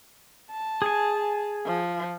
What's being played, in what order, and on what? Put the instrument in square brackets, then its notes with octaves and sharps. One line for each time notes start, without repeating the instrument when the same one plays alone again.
[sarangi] A5
[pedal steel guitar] G#4 G#5
[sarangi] F3